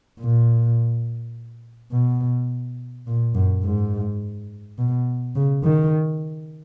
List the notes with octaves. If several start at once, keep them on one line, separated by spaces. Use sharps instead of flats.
A#2
B2
A#2
F#2
G#2
B2
C#3
D#3